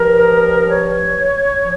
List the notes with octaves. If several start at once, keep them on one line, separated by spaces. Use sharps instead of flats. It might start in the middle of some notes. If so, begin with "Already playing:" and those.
Already playing: G2 F3 A#4
C#5
F3